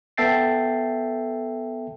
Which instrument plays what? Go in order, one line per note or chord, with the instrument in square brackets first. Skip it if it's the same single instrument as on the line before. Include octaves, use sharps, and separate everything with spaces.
[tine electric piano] B3 A4 E5 G5 A6 C7